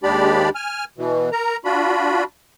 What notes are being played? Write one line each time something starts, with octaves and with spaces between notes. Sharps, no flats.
D#2 G#3 D4 G4 D5 B5
G#5 F6
B2 E3
A#4 A#5
D4 F4 F#4 B5